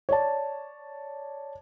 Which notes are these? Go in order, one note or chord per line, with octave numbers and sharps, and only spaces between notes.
C#5 D5 A5